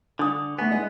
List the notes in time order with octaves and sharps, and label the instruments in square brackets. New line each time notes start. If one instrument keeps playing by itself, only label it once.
[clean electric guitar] D3 [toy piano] D4 D#6
[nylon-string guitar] A3 G#5 [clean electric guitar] B3
[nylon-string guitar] G#3 E4 D#5